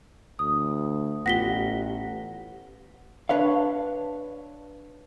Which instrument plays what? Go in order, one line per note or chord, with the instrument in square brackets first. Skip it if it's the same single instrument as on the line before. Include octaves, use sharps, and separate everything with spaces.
[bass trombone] D2 [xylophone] D#6
[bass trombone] A1 [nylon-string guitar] B3 F4 G4 [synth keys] F#5 [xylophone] A#6 B6 G7
[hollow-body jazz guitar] D4 B4 C#5 F5